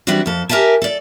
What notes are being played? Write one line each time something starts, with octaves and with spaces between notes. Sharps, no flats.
E3 G3 C4 D4 E4 F#4
F2 A4
G4 A#4 B4 E5 G#5 A5
A4 D5